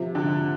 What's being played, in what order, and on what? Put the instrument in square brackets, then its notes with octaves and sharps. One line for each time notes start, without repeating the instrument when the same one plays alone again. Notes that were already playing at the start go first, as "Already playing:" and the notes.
Already playing: [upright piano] C3 [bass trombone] F3
[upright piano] D3